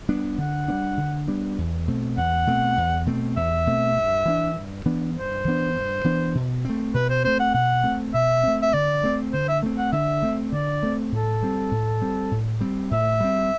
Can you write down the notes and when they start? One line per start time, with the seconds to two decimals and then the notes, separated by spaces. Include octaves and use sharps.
0.09 G3 B3 D4
0.38 D3 F#5
0.68 G3 B3 D4
0.98 D3
1.27 G3 B3 D4
1.58 E2
1.88 B2 A3 C4
2.17 E2 F#5
2.47 B2 A3 C4
2.78 E2
3.06 B2 A3 C4
3.37 E2 E5
3.66 B2 A3 C4
3.96 G2
4.25 E3 B3 D4
4.56 G2
4.86 E3 B3 D4
5.15 G2 C5
5.45 E3 B3 D4
5.75 G2
6.04 E3 B3 D4
6.35 B2
6.65 A3 C4
6.94 B2 B4
7.10 C5
7.25 A3 C4 C5
7.40 F#5
7.54 B2 F#5
7.84 A3 C4
8.14 B2 E5
8.43 A3 C4
8.62 E5
8.73 D3 D5
9.03 A3 C4
9.33 D3 C5
9.49 E5
9.63 A3 C4
9.78 F#5
9.92 D3 E5
10.22 A3 C4
10.52 D3 D5
10.83 A3 C4
11.12 A2 A4
11.42 G3 C4
11.71 A2
12.01 G3 C4
12.31 A2
12.61 G3 C4
12.91 A2 E5
13.20 G3 C4